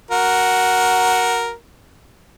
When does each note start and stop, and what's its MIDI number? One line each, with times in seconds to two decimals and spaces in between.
0.11 1.52 66
0.11 1.52 70